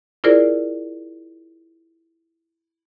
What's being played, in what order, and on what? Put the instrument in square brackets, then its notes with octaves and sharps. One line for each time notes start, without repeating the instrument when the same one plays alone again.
[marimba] E4 F4 G#4 A#4 C5 D5